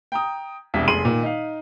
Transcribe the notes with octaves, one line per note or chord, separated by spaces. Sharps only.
G5 A#5 D#6
E1 C2 B6
F1 G#4 C6 D#7 F#7
A#2 D#3
D#4 F5